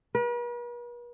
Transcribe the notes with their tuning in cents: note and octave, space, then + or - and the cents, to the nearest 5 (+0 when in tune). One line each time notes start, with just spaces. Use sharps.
B4 -45